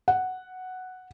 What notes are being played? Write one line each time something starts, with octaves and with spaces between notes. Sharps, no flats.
F#5